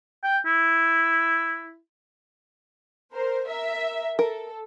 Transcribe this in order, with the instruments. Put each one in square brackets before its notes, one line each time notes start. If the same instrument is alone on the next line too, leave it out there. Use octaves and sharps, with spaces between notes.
[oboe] G5
E4
[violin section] A#4 C5
A#4 E5
[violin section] A4 [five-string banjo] A#4